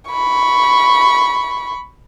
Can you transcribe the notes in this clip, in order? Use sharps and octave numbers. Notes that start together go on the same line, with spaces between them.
B5 C#6